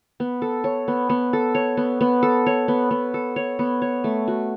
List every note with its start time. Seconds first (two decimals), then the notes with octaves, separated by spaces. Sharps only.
0.20 B3
0.42 A4
0.64 C#5
0.88 B3
1.10 B3
1.33 A4
1.55 C#5
1.77 B3
2.01 B3
2.23 A4
2.46 C#5
2.68 B3
2.91 B3
3.14 A4
3.36 C#5
3.59 B3
3.82 C#5
4.04 A3
4.28 F#4